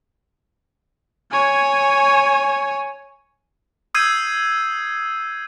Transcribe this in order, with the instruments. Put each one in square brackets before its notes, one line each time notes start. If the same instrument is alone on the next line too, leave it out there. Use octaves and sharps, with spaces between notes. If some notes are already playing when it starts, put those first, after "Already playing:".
[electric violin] C#5 G#5
[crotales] D#6 E6 G6 G#6 C7 D#7